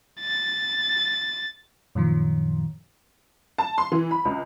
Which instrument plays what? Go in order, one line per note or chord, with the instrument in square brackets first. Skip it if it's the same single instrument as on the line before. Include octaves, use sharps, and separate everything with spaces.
[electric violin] A6
[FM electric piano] F#2 A#2 D#3 F3
[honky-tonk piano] A5
C6
E3
B5
C#2